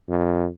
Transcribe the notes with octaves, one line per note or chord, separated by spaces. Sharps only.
F2